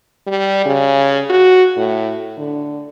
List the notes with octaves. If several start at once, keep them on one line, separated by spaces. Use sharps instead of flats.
G3
C#3
F#4
A2
D3